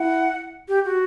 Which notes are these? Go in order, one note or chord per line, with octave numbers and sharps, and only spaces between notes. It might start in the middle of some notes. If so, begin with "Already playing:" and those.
Already playing: E4 F#5
G4
F#4